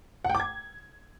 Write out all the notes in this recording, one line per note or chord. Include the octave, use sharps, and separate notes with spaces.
F#5
G5
D6
G#6